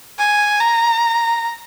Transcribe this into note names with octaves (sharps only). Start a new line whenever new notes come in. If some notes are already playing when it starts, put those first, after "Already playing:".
G#5
A#5